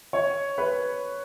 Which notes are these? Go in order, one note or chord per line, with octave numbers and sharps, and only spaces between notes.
C#5
B4